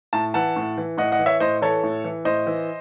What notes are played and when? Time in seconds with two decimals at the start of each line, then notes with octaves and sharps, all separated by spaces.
0.13 A2 A5
0.34 E3 F#5 A5
0.56 A2
0.78 E3
0.98 A2 D#5 F#5
1.12 D#5 F#5
1.19 E3
1.26 C#5 E5
1.40 A2 C5 D#5
1.62 E3 A4 C#5
1.83 A2
2.04 E3
2.25 A2 C5 D#5
2.47 E3